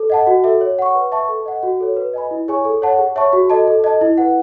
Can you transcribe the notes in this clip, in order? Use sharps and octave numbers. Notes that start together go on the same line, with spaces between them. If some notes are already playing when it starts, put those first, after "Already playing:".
Already playing: A4
D#5 F#5 A5
F#4
A4 E5
C#5
F#5 C#6
B4
E5 A5 C#6
A4
D#5 F#5
F#4
A4 C#5
B4
D#5 G#5 B5
E4
G#4 C#5 G#5 C#6
A4
C#5 F#5 A5
G#4
C#5 E5 A5 C#6
F#4
A4 D#5 A5
A4
D#5 A5
E4
B4 F#5